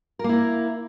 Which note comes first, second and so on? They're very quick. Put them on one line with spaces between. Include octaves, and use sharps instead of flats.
A#4 A#3 E4